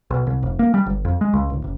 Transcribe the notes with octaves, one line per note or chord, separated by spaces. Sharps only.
B1
C2
F1
A#3
G3
G1
F2
G#3
C#2
D1
F#1